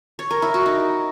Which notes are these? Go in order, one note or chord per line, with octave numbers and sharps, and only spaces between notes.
C#5
A#4
E4
F#4
D#4